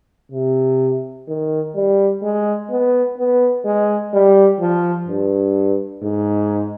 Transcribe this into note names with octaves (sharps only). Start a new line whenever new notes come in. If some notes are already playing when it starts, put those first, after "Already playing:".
C3
D#3
G3
G#3
B3
B3
G#3
G3
F3
G2
G#2